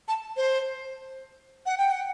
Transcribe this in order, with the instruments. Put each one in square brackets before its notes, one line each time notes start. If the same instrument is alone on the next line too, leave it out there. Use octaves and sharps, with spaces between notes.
[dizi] A5
C5
F#5
G5
F#5